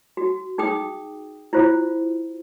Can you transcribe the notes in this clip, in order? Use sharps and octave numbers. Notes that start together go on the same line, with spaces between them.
F#4
D#4 G#4 G5 D#6
E4 F4 C5